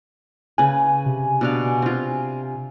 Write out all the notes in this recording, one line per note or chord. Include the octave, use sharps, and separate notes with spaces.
C#3 B4 G#5
C3
B2 D4 F5
C4 F4